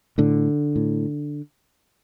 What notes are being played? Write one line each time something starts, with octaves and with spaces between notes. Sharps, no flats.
A2 D3
A2